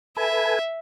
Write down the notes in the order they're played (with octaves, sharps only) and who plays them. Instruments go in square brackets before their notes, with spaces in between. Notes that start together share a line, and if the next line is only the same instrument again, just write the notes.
[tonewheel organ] A4 B4 G#5 [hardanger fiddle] E5